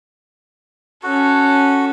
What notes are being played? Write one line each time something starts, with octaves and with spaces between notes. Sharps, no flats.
C#4 F#4 A4